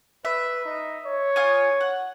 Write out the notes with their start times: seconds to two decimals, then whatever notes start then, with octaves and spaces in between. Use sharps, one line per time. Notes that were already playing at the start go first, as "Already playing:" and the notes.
0.25 B4 E5
0.65 D#4
1.05 C#5
1.36 F4 G#5 D#6
1.81 F#5